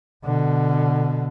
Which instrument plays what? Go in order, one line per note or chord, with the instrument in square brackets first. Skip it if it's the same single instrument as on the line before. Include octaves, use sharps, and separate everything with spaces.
[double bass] B2 D3